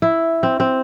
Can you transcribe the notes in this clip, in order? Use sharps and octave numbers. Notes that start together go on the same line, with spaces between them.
E4
C4
C4